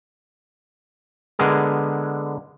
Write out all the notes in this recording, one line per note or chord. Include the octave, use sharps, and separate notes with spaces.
D3 G#3 B3 G#4 A#4